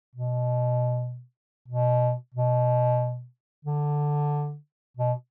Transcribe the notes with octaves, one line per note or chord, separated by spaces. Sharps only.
B2
B2
B2
D3
B2